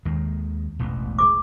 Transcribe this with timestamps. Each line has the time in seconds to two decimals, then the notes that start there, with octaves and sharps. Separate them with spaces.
0.05 D#2 D#3 G#3
0.79 E1 A1 B2
1.19 G#4 D6